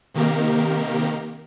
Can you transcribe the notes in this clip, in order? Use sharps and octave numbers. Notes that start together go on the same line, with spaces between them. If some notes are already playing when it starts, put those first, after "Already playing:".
C3 D#3 A#3 G4 A#4